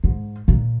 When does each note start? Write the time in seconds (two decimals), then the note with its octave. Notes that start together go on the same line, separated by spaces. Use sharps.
0.04 G#2
0.48 A#2